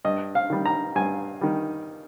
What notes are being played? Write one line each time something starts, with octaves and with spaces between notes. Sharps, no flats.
G2 D#5
F5
D#3 G3
A#5
G2 G#5
D#3 G3